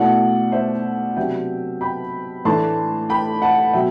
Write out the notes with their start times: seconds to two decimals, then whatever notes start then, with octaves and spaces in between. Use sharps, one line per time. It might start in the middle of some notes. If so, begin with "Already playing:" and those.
Already playing: B2 A3 E4 D5 F#5
0.52 C5 E5
1.16 C3 F#3 B3 D4 E5 G5
1.81 G5 B5
2.45 A2 E3 A3 D4 A5 C6
3.10 G5 B5
3.42 F#5 A5
3.74 B2 F#3 E5 G5